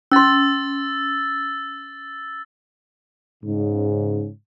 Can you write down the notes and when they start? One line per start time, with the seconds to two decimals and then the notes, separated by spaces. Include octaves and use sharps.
0.12 C#4 C6 E6 A6
3.44 G#2 C#3